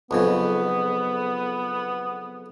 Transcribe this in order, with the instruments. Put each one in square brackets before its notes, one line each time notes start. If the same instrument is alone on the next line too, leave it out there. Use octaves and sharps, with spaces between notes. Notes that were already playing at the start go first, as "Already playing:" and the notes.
[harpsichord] B1 F2 C#3 [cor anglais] B3